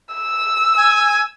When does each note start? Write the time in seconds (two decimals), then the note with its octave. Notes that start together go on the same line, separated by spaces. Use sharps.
0.14 E6
0.77 G#5